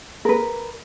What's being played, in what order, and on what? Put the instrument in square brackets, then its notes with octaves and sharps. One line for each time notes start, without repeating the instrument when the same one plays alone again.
[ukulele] A#4 B4